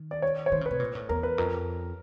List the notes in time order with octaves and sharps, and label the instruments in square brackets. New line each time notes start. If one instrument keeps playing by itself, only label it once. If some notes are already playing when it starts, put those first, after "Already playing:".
Already playing: [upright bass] D#3
[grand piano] D5
C#5
C#5
[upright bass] D#3 [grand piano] C5
[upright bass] C#3
[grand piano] B4
[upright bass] C3
A#2
A2
[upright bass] E2 [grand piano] A#4
[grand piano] B4
[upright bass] F2 [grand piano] A#4